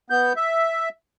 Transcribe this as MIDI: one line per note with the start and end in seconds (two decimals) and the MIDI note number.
0.10 0.33 59
0.10 0.33 91
0.36 0.89 76